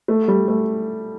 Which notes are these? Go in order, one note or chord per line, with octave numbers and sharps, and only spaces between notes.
A3
G3
A3